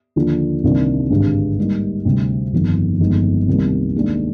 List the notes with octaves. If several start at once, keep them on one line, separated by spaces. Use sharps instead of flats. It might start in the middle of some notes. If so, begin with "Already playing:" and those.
D#2 D3 F3
C2 C3 D#3 A#3 D4
G#1 G2 D3 G#3
G#2 G3 A#3 D#4
D2 C3 G3 C4
G1 F2 D#3
G1 F2 D#3 G#3 D#4
C2 C3 D#3 G3 A#3
D#2 D#3 G#3 D4